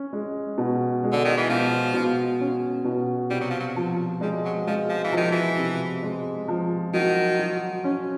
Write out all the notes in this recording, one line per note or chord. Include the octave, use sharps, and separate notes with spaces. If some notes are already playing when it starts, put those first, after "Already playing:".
Already playing: C#4
G#3
B2
G#3
D3
D#3
E3
B2 F3
B2
C#4
B2
C3 G3
F#3
F3
F#3
F3
G3 G#3
F#3
F3 G#3
F3
E3
D#3 F3
E3
C3
G#3
F3
D#3 F#3
F#3
C#4